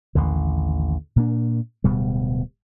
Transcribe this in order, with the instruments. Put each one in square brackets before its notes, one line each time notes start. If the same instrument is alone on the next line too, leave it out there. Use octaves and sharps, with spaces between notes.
[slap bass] A1 D#2 D3
A#2 A#3 D4
D1 B2 G3